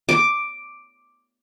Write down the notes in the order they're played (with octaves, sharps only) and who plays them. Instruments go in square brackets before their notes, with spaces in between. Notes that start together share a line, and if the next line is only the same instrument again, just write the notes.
[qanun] D6